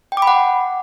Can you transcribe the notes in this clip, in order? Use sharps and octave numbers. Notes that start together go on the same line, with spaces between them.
G5
D6
B5
F#5